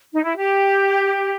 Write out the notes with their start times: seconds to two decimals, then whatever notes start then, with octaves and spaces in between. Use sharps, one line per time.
0.13 D#4
0.24 E4
0.36 G4